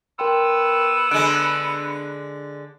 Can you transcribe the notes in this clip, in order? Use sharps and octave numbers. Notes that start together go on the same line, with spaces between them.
B3 A#4 G5 C6 E6
D3 G#3 F#6 D7